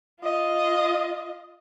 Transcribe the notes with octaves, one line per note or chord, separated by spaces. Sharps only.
F4 D#5